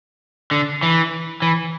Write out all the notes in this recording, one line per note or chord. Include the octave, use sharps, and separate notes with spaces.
D3
E3
E3